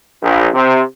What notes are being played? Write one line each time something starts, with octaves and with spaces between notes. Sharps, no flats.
A#1
C3